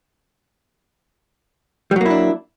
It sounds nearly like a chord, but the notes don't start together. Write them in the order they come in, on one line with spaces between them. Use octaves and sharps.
G3 F#3 A#3 E4 D4